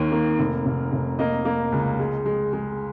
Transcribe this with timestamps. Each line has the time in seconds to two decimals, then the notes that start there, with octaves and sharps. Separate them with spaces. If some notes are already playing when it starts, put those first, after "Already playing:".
Already playing: D#2 D#3 A#4
0.12 A#3
0.39 F1
0.66 F1
0.93 F1
1.19 A#3 D#5
1.45 A#3
1.72 C#2
1.99 G#3
2.26 G#3
2.53 G#3